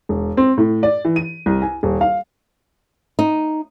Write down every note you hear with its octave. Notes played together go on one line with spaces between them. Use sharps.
E1
C4
A2
D5
E3
D#7
C2
G#5
D#1
F5
D#4